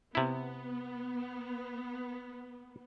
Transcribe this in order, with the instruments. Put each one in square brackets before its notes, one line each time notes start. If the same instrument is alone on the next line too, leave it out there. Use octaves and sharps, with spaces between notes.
[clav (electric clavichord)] C3 E4 [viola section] B3